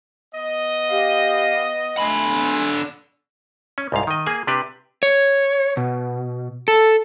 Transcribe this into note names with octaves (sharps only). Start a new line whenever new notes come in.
B3 D#5
G4 F5
D3 A3 G#5 B5 C6
C#4
C2 G#2 F5
D#3 D#5
A#3 G#4 G#5
C3 D4 G4 B4
C#5
B2
A4